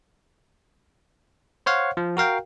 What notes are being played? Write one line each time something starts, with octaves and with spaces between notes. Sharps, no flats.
C5 C#5 F5 F#5
F3
F#4 A#4 F5 G5